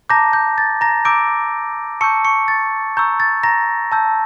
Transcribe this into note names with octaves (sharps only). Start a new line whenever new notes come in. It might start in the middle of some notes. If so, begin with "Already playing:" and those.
A5 A#5 D6 G6 A#6
G6
A6
A#5 A#6
A#5 D6 E6 G6 D7
A5 C#6 E6 G6 C#7
C#6 C#7
A6
A#5 C#6 E6 G6
A6
A#5 A#6
A5 E6 G6